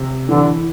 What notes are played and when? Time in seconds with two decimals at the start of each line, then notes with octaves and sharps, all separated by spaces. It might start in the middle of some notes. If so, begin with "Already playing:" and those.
Already playing: C3
0.29 D3 E3